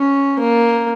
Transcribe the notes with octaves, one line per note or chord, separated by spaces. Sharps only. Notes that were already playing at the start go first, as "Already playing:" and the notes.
Already playing: C#4
A#3